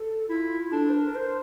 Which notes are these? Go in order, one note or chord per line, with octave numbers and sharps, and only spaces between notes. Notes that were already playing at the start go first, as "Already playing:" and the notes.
Already playing: A4
E4 F4
D4 A4
C5
A#4
C5